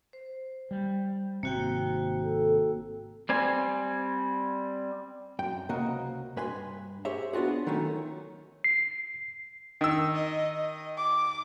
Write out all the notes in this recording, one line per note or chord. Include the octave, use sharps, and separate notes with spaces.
C5
G3
G#1 C3 A#3 C4 F#4 G5
A4
G3 C4 G#5
F#2 G5
C#2 C3 A#3 F#4 D#5
G2 B4 G#5 C6
G4 G#4 C5 C#5 E5
B3 D4 F4 F#4 G#4
D#3 F#3 A3 C#4
C7
D#3 E6
D#5
D#5
D6